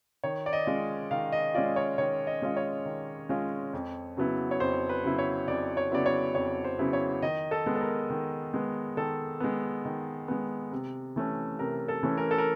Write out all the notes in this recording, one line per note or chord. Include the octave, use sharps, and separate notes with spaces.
D#3 C#5
D5
D#5
G#3 C#4 F4
D#3 F5
D#5
G#3 C#4 F4 D5
C#5
D#3 C#5
D#5
G#3 C#4 F4
C#5
D#3
G#3 C#4 F4
F2
C#3 F#3 B3 E4
C#5
F2 C5
B4
C#3 F#3 B3 E4
C#5
F2 D5
C#5
C#3 F#3 B3 E4 D5
C#5
F2 C#5
C5
C#3 F#3 B3 E4
C#5
D#3 D#5
A4
G#3 B3
A4
A#4
D#3
G#3 B3
D#3 A4
G#3 B3
D#3
G#3 B3
C3
E3 A3 C#4
C3 A#4
A4
E3 A3 C#4
A#4
A4
A#4